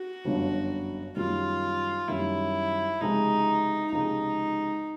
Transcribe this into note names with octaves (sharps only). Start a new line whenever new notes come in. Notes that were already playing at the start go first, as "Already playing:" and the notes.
Already playing: F#4
G1 F#2 D3 F3
F#2 D#3 G3 F4
F#2 D#3 G3 E4
C#2 C3 F3 G#3 D#4
C#2 C3 F3 G#3 D#4